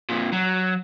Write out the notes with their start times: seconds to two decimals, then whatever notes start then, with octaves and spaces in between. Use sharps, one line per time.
0.10 F2 A#2
0.32 F#3